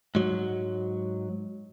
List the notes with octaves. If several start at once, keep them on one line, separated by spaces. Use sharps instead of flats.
G#2 F#3